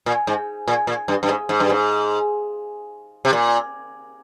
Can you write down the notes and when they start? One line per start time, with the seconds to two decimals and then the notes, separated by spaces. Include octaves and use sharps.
0.06 A#2
0.27 G#2
0.68 A#2
0.87 A#2
1.08 G2
1.23 G2
1.28 G#2
1.49 G#2
1.60 G2
1.70 G#2
3.25 C3
3.33 A#2